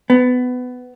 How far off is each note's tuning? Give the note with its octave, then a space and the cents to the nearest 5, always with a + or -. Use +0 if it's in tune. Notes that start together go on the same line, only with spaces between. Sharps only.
B3 +20